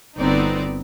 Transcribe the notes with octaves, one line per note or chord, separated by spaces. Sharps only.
G1 B3 C4 D#4 D5